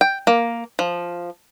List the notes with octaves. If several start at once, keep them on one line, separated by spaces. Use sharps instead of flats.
G5
A#3
F3